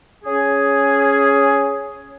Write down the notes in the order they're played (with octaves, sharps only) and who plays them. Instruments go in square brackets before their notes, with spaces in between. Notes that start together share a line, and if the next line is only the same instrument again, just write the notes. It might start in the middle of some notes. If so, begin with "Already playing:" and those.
[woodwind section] C#4 G#4